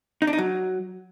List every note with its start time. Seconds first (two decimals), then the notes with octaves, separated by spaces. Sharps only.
0.22 D#4
0.27 D4
0.33 D#4
0.38 F#3